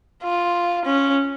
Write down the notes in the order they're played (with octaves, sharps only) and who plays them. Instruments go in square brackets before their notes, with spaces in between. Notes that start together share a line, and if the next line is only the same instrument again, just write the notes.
[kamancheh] F4
C#4